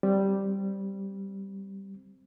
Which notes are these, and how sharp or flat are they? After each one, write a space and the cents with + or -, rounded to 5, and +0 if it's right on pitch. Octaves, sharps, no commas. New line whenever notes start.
G3 -5 C4 +0